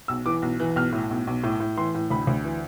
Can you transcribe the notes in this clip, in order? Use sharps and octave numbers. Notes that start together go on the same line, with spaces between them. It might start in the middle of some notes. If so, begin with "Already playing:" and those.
B1 E6
E3 D6
B1
E3
B1 F6
A2
B1
B1
A2
A2
E3 C6
A2
D2 B5
D2
E3